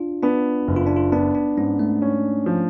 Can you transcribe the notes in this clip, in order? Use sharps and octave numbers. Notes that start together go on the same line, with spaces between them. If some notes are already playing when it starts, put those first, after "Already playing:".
Already playing: D4 F4
B3 D4
F#1
F4
D4
F4
B3 D4
D4
G#2 C#4
A3
C#4
F3